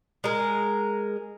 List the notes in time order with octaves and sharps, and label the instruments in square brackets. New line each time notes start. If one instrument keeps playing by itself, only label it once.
[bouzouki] G#3 A#4